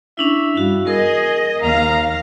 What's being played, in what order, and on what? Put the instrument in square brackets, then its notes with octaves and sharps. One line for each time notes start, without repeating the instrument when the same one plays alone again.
[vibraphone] C#4 D4 E4 [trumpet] E5
[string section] G2 [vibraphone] E4 F#4 F5
[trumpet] G#4 [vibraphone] A#4 [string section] D#5
[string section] D#2 F5 [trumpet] A#5